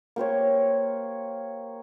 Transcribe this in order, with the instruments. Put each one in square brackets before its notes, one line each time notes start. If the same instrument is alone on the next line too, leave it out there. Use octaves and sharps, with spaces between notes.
[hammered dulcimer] A#3 G4 C5 C#5